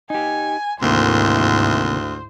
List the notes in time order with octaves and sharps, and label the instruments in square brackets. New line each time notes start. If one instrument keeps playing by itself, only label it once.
[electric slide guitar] D#4 G4 [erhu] G#5
[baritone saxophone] D2 [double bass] G#2 E4 [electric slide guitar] C3 D#3 A#3 [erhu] C5